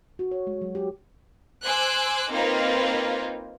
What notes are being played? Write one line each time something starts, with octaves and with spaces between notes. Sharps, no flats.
F#4
C#5
G#3
F#3
G4
C5 G#5 D6 E6 F#6
A#3 C4 D#4 F4 A#4 B4